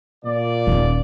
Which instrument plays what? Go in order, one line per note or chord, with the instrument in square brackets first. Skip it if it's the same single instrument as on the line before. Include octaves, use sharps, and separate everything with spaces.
[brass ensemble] A#2 D5
[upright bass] D#1 C#4